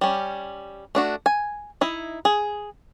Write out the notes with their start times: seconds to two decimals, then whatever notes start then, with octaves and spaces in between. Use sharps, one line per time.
0.01 G3 C#4
0.95 A3 D4 F#4
1.26 G#5
1.81 D#4 E4
2.25 G#4